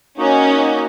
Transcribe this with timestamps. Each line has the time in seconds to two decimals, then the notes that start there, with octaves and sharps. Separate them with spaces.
0.18 A#3 C#4 D#4 F#4